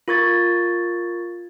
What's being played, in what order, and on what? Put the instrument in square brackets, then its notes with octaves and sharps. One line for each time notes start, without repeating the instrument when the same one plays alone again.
[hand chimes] F4 A#4 C#6 G#6 A6